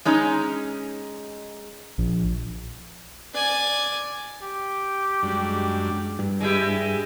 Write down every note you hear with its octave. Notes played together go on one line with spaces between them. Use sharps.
G#3 C#4 D#4
A#1
D5 G#5
G4
F#2 G3 G#3 D4
G2
G#3 E4 G4